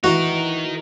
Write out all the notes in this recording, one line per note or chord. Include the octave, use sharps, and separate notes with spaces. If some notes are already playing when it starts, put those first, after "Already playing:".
E3 D#4 F#4 A#4